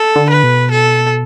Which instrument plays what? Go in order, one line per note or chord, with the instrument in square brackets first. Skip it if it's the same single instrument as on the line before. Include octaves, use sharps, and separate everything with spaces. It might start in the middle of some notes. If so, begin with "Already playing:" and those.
Already playing: [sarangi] A4
[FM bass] D3
[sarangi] B4
[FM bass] B2
[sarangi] A4